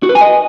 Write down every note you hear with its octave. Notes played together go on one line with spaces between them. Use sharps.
F#4
B4
G#5
D#5